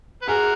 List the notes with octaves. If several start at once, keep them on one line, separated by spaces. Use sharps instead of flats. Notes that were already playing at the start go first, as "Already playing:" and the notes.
B4
F#4 G#4 A#4